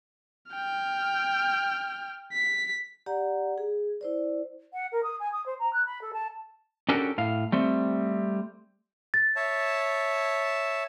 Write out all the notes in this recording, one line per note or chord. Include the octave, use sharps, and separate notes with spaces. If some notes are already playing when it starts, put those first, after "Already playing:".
G5 F6
B6
G4 D5 F#5 A#5
G#4
E4 C5 D5
F#5
A#4
D#6
G#5
D#6
C5
A#5
F#6
B5
A4
A5
C#4 D4 F#4 G4 A4 A#4
A2 F5
G3 A3 C4
A6
C#5 E5 A5